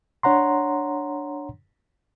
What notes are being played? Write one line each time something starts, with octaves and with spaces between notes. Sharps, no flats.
D4 C#5 F#5 A#5 C6